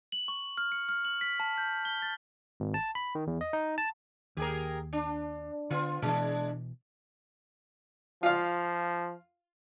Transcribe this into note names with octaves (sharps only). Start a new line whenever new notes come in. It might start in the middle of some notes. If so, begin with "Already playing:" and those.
F#7
C#6
F6
C#7
F6
F#7
B6
A5
G6
G7
A6
G#1
A5
B5
D#3
E2
D#5
D#4
A5
D#2 G4 G#4 A#4
D4
D3 B3 F4
B2 E3 G#3 D4
F3 F4 F5